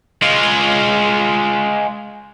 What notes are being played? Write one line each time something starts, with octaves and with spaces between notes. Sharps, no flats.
G#3 F4